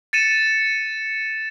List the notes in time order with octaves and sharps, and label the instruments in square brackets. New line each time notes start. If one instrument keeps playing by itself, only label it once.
[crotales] A6 C#7 D#7 E7